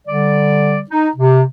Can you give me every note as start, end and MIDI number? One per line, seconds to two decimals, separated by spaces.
0.07 0.80 50
0.07 0.80 55
0.07 0.80 74
0.90 1.09 63
1.16 1.42 48